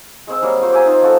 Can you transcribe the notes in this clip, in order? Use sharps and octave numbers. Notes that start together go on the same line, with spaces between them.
G#3 C4 E6
F#3 G3 A#3 G#4
F4 F#4 C5
G4 E5 G#5 A#5
D#4 F4 C5
F3 F#4 A4